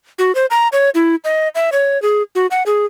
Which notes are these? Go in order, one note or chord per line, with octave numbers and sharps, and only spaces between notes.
F#4
C5
A#5
C#5
E4
D#5
E5
C#5
G#4
F#4
F#5
G#4